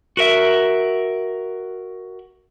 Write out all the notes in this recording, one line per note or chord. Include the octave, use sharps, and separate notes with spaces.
F#4 A#4 E5